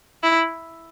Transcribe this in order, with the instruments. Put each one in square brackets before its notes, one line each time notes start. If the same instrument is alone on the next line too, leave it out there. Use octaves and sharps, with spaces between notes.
[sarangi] E4